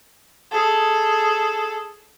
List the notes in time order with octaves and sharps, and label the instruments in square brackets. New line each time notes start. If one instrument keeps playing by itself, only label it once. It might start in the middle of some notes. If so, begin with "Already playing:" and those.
[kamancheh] G#4 A4